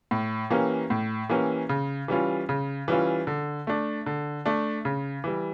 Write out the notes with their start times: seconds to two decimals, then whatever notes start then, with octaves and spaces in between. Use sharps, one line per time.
0.11 A2
0.50 E3 A#3 C#4 G4
0.90 A2
1.29 E3 A#3 C#4 G4
1.69 C#3
2.08 E3 G3 C#4 F4
2.49 C#3
2.88 E3 G3 C#4 F4
3.27 D3
3.67 A3 D4
4.06 D3
4.46 A3 D4
4.85 C#3
5.24 E3 G3